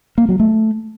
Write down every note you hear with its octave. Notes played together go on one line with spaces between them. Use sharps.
A#3
F#3
A3